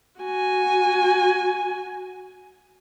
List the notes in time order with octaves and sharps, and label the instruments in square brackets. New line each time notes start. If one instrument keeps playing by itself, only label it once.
[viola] F#4 G#5